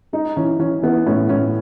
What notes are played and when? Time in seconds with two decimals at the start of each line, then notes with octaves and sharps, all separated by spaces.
0.13 G#3 D#4
0.37 E3 C#4
0.59 E3 C#4
0.82 E3 B3
1.06 A2 C#4
1.29 A2 C#4